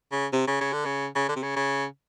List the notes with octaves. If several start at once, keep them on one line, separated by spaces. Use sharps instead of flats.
C#3
C3
C#3
C#3
D3
C#3
C#3
D3
C3
C#3
C#3